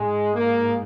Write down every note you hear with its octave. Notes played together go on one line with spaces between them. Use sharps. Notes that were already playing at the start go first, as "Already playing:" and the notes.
Already playing: G#2 G#3
A#3